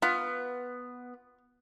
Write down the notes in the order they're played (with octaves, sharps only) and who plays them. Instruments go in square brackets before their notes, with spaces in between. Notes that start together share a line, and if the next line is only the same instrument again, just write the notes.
[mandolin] B3 [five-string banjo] F4